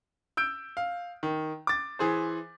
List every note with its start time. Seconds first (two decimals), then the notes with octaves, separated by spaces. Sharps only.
0.37 E6 G6 D7
0.77 F5
1.23 D#3
1.67 D6 A6
1.99 E3 G#4 C5